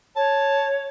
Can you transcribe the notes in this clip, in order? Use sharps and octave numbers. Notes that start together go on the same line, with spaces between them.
C#5 A5